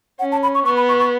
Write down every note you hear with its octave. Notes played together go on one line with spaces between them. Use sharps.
C#4 F#5
A5
B5
C#6
B3 C#6
B5
C#6
C#6